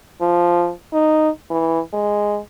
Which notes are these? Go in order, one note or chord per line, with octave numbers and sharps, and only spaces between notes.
F3
D#4
E3
G#3